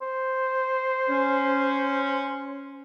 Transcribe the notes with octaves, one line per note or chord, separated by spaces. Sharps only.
C5
C#4